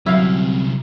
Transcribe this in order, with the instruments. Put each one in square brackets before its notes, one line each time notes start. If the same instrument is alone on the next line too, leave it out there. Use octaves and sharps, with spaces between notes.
[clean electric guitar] C2 [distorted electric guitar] C3 C#4 [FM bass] F#3 [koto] E4 F5